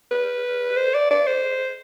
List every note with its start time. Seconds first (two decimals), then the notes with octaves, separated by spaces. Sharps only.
0.11 B4
0.77 C5
0.94 D5
1.11 D5
1.27 C5